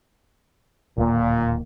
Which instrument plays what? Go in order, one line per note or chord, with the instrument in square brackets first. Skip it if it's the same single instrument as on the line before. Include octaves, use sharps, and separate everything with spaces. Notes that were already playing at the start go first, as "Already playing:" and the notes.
[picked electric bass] D1 D#2 A#3 [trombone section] A#2